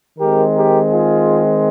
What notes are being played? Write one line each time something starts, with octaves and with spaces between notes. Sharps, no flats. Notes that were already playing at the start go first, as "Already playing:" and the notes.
D#3 G#3 C4 G4 A#4
G4 A#4
F4 G#4